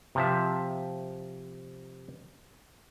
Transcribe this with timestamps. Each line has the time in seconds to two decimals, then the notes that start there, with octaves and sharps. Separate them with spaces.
0.15 C3 F3 E5